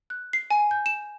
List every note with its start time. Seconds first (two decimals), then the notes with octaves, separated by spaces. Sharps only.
0.10 F#6
0.33 C7
0.50 G#5
0.71 G6
0.86 E7